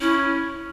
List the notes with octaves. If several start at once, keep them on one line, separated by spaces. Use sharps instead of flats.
C#4 E4